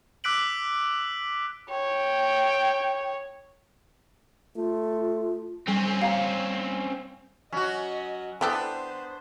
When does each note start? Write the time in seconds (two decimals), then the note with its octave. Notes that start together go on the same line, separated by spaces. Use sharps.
0.24 D6 E6 F#6 B6 D7 F#7
1.70 C#5 G5
4.56 A3 F4
5.68 G3 C4 C#4
6.01 F5 A#5
7.52 F#3 C#4 F#4 D#5
8.41 E3 B3 D4 G4 A4 C5